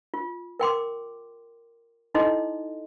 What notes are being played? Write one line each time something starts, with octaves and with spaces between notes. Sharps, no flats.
F4
A#4 G5 C6 D6
D#4 E4 A4 D#5 C6